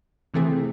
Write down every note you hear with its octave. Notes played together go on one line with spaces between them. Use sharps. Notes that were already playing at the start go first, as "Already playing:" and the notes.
C3 E3 A3 C4 G#4